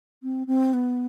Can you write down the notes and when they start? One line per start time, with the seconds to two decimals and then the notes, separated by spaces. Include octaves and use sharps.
0.23 C4
0.47 C4
0.73 B3